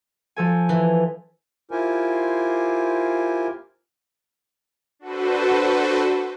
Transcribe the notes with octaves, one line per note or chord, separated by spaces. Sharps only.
F3 A4 G#5
E3
E4 F4 G4 A#4 C5 G#5
D4 F#4 A4 B4 C5